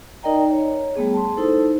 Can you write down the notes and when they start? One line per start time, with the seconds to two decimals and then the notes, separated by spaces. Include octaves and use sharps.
0.23 D#4 A#4 D5 D#5 G5 A#5
0.51 C#5
0.95 G3 A3 B3 G#4
1.14 A5 C6
1.37 D#4 E4 A4 C5